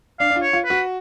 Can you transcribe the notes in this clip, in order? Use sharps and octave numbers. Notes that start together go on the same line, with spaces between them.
D4 F5
D4
F4
C#5
F4
B4
F#4